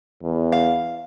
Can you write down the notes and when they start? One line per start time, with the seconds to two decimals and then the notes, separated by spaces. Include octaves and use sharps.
0.23 E2
0.52 F5